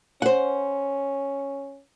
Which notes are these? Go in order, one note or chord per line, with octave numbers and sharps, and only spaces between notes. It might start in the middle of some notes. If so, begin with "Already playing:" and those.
C#4 C5 F#5